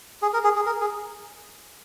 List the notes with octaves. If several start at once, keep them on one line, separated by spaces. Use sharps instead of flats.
G#4
A#4
G#4
G#4
A#4
G#4